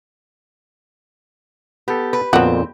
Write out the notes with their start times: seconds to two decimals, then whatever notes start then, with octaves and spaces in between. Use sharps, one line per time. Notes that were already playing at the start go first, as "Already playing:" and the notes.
1.88 B3 G4 A4
2.13 B4
2.33 F2 A#2 D3 B3 C4 F#4